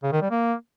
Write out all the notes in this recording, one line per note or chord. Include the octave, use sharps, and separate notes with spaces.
C#3
D#3
G3
A#3